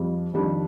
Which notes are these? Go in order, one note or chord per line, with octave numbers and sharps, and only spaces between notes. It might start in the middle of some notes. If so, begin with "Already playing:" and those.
Already playing: F2 G3
F2 D#3 G3 D4